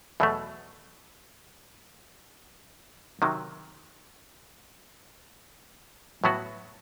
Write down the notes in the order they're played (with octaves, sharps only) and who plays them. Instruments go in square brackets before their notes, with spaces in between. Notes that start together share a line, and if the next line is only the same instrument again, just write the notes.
[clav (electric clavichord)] E2 B2 F#3 A3
C3 D#3 F#3
A2 F#3 B3 F#4